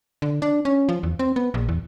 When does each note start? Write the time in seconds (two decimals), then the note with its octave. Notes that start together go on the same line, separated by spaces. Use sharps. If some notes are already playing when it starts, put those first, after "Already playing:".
0.22 D3
0.42 D4
0.65 C#4
0.89 F3
1.03 E2
1.19 C4
1.36 B3
1.54 A#1
1.69 E2